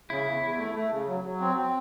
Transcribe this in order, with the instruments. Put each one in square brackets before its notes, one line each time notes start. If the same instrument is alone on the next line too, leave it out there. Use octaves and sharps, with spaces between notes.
[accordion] C#3 [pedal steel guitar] E4
[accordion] E2
E2
A3
A3
C#3
F#3
F#3
C4
C4